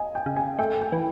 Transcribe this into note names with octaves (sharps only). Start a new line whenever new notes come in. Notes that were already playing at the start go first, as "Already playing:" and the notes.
Already playing: D#5 G#5
G5
C#3
G#5
A3 G5
G5
E3